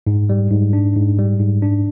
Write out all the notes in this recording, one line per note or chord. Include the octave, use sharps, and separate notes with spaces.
G#2
G3
G#2
D4
G#2
G3
G#2
D4